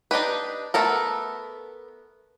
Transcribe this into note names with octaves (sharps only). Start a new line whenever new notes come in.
D4 D#4 G4 B4
A3 B3 A4 A#4